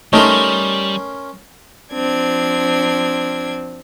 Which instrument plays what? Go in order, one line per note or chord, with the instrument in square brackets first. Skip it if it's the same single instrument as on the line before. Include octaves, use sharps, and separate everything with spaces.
[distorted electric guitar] G3 [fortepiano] A3 D#4 [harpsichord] C#4 A#4 C6
[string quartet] F3 C4 D4 G#6